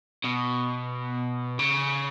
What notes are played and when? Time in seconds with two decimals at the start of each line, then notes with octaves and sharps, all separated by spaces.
0.25 B2
1.59 C#3